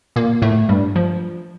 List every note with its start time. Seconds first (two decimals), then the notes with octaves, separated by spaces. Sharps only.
0.16 A#2 A#3
0.42 A2 A3
0.69 G2 G3
0.96 F3